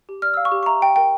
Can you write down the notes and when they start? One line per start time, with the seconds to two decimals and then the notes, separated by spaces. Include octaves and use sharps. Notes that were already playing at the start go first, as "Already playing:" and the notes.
0.09 G4
0.22 D5 F6
0.34 F5 E6
0.45 C#6
0.52 G4
0.63 C#6
0.66 E5 A#5
0.82 G5
0.96 A#4 G5